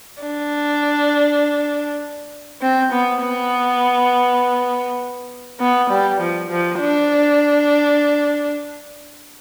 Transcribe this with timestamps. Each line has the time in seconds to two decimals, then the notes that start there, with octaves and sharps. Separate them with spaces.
0.22 D4
2.61 C4
2.92 B3
3.22 B3
5.60 B3
5.90 G3
6.21 F3
6.51 F3
6.80 D4